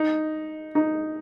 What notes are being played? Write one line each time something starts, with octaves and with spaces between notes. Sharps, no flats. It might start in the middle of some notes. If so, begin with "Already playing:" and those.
Already playing: D#4
D#4